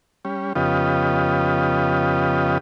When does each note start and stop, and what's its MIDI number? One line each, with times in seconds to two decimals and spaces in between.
0.25 0.53 55
0.25 0.53 61
0.56 2.58 41
0.56 2.58 49
0.56 2.58 59
0.56 2.58 65
0.56 2.58 67
0.56 2.58 75